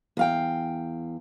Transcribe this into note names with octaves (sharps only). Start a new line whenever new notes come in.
E2 F5 G5